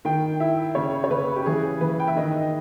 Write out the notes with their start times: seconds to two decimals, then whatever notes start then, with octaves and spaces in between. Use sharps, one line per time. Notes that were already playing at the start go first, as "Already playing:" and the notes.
0.05 D#3 G5
0.40 E4 E5
0.75 C#3 C#5
1.04 C#5
1.10 C#3 B4
1.36 G4
1.46 E3 G#4
1.81 E3 B4
2.00 G5
2.08 E5
2.16 D#3 D#5